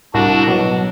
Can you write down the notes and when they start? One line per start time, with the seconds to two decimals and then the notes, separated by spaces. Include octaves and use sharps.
0.14 C2 D4 F#4
0.47 B2 F#3